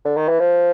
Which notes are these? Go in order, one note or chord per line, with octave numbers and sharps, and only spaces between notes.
D3
D#3
E3
F3